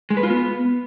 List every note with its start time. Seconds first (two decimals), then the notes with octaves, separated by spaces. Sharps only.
0.10 G#3
0.17 B4
0.23 F4
0.30 B3